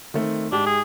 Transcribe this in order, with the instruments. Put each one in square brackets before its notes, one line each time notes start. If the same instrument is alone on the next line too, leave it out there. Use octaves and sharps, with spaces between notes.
[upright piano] D#3 A3 C4
[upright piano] G#2 G4 [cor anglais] D4
[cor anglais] G#4